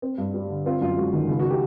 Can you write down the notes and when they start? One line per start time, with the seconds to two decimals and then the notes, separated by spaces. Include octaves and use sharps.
0.02 C4
0.18 G2
0.34 G3
0.50 D3
0.66 C4 F4
0.81 F#2 F4
0.97 G#3 F#4
1.13 D#3
1.28 C#2
1.39 F#4
1.50 G4